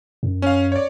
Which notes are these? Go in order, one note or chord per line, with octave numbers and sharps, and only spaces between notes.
F#2
C#4 F5
C#5 D5